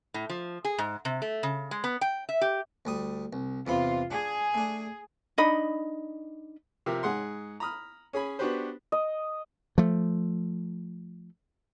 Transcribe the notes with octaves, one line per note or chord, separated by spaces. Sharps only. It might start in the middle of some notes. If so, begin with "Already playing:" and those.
A2
F3
G#4
G#2
C3
A3
C#3
G#3
B3
G5
E5
G4
D2 G3 D#6
C2
E2 C3 F4 B5
D4 G#4
A3 D4
D4 D#4 D#5 B5
C3 F3 G4 A#4 E5
G#2 G#4 F#5 C6
A#5 B5 D#6 F6
C#4 G#4 G#5 B5
B3 D4 F#4 G4 B4 C5
D#5
F3 A3